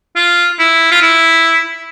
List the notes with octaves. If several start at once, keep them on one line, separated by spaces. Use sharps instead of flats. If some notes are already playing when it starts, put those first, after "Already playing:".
F4
E4
F4
E4